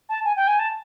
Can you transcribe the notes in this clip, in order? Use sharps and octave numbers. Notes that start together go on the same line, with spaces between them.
A5
G#5
G5
G#5
A5